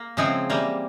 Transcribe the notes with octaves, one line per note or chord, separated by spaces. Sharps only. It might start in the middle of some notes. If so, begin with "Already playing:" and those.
Already playing: A#3
C#3 F3 G#3 C4 E4
E3 G3 A#3